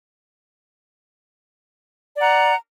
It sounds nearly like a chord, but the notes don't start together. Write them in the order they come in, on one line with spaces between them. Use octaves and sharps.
D5 F#5 A#5